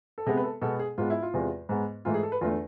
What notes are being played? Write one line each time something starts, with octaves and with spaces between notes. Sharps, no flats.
A4
C3 G#3 B3 G#4
B4
A4
B2 G#3 B3 A4
G#4
G#2 G#3 B3 F4
E4
F4
E2 C3 G#3
G#2 G#3 B3
G#2 E3 A3 F4
G#4
A4
B4
E2 D3 A3 F4